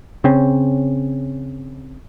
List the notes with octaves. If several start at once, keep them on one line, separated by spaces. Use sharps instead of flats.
C#3 C4 C#4